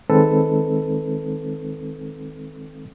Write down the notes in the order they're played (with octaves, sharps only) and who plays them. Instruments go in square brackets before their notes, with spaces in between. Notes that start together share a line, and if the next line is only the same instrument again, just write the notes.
[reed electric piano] D#3 G#3 C4 D#4 A4 B4